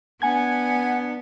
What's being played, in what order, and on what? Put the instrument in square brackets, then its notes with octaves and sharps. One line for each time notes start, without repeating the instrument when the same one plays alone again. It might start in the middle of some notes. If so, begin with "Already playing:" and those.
[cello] B3 [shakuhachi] D4 [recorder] F#5 [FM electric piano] G#5 G#6